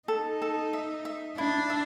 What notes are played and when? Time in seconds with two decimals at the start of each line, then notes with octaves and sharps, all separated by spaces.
0.08 D#4 A4
0.42 A4
0.73 E5
1.05 E5
1.37 D4 E4
1.70 E5